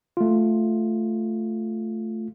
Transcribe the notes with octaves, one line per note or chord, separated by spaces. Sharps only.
A3 F4